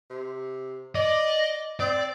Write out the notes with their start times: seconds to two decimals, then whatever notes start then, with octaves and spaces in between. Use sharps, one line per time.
0.10 C3
0.95 D5 D#5
1.80 C4 D5